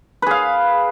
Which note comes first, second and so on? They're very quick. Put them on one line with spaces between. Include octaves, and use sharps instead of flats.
B4 G#4 F5